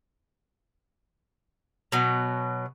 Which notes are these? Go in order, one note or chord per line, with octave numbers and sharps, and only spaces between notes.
B2 F#3